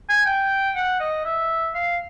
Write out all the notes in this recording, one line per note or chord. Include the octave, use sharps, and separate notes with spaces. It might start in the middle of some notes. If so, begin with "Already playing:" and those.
G#5
G5
F#5
D#5
E5
F5